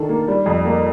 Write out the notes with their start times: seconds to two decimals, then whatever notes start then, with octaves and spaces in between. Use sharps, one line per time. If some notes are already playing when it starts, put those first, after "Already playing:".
Already playing: D#3 D4 A4
0.09 A#3
0.28 G3
0.46 F2
0.65 A#3